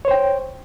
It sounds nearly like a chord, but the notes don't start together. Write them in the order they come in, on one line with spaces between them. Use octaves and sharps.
C#5 C5 G5